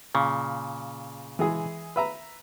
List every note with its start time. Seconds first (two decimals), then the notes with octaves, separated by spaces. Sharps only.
0.15 A#2 C#3
1.39 E3 G#3 G#4
1.96 B4 E5 A#5